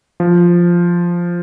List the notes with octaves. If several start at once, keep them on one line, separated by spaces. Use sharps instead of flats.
F3